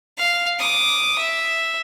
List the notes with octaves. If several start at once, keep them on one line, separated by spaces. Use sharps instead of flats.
F5
D6 D#6
E5